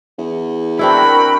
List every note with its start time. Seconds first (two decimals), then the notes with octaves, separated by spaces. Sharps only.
0.18 E2
0.79 C4 D4 E4 F#4 A#4 G5 B5